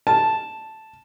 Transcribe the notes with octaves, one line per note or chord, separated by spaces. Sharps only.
A5